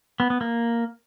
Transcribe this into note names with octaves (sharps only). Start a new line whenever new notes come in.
B3
B3
A#3